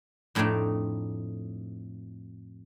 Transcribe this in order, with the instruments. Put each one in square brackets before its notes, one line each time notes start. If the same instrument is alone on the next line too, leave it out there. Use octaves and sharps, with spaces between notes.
[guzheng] F2 A2 A3 C4 D4 D#4